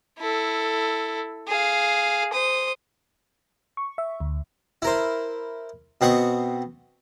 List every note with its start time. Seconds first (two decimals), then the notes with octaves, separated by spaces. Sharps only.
0.19 E4 A4
1.48 G#4 F5
2.33 C5 D#6
3.77 C#6
3.98 E5
4.20 D2
4.82 E4 A#4 C5
6.01 B2 C4 F#5 C#6 D#6